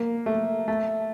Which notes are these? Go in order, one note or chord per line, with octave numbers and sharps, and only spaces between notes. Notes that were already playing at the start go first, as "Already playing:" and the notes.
Already playing: A#3
A3
A3